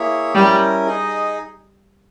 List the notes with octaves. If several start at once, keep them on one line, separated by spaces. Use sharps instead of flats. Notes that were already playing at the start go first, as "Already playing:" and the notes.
Already playing: A#3 E4 G#4 C#5 E5
G3 C#4 E4 A#4
D#4 G#4 D#5